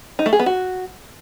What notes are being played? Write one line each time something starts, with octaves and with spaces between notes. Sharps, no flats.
D#4
A3
G#4
B3
F#4